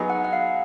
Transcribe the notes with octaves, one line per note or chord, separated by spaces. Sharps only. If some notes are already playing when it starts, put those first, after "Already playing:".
Already playing: F#3 B3 D#4 G#4
F#5
F#5
F5